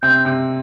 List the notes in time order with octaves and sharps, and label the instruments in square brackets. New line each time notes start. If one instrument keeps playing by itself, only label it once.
[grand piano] C3 C4 [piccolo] G6
[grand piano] C3 C4